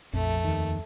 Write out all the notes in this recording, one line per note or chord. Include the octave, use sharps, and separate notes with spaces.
A#1 F2 A3
D#2 D#3